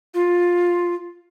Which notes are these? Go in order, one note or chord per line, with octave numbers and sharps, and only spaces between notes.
F4